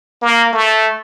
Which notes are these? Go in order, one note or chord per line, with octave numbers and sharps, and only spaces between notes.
A#3
A3